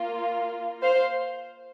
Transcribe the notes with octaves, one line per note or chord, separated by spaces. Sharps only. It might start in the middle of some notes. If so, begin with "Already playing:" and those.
Already playing: A#3 F4
C5 F5